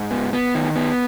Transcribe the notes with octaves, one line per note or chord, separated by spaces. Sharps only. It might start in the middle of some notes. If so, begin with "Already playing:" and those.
Already playing: G#2
B3
B3
D#3
B3